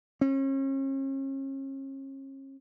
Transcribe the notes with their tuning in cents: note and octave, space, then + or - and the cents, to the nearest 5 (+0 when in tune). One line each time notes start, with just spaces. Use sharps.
C#4 -40